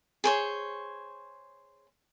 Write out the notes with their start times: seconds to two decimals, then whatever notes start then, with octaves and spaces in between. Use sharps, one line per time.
0.24 G#4 C5 C#5